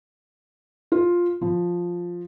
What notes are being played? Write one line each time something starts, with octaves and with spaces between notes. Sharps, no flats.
F4
F3